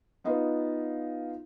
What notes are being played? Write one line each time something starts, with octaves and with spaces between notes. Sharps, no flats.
B3 D#4 F4 B4